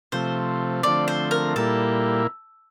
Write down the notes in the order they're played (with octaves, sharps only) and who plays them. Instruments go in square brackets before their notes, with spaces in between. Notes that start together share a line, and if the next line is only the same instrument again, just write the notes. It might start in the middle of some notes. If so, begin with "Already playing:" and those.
[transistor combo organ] C3 F3 A3 [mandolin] C5
[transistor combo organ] D3 F3 A3 C4 [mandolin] D5
[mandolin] C5
A#4
[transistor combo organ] A#2 G3 A#3 E4 [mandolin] A4